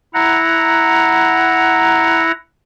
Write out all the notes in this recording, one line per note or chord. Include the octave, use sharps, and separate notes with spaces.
E4 F#5 A#5